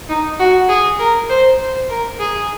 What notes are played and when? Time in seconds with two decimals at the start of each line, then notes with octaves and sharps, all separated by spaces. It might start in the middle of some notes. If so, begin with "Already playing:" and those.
0.09 D#4
0.39 F#4
0.69 G#4
0.99 A#4
1.29 C5
1.59 C5
1.89 A#4
2.20 G#4